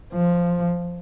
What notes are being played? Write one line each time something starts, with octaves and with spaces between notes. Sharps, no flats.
F3